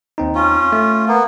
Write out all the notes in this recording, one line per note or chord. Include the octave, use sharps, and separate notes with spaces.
D#2 C4 D#4
C#4 F4
A3
A#3 B3